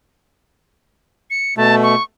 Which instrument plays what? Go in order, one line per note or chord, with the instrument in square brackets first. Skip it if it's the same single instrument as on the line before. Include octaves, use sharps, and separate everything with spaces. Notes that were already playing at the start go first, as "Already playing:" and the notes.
[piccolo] C#7
[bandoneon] B2 A3 [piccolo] A5
[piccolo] C#6